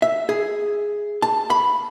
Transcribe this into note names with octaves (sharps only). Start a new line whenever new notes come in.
E5
G#4
A5
B5